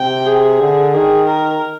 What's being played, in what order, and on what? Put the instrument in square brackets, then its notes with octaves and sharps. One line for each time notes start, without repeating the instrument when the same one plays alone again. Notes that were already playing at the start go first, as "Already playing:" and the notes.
Already playing: [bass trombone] C3 [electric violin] G5
[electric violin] G#4
[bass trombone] D3
[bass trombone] D#3 [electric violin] G#4
[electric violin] A#4